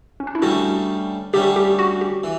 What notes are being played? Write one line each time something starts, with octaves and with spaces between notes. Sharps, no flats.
C#4
D4
E4
D2 D3 G3 C#4 F#4
D2 D3 G3 C#4 G4
G4
F#4
G4
E3